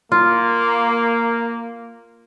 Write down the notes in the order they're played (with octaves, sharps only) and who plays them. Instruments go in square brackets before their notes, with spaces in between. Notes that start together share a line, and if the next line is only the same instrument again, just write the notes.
[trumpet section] A#3 [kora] F4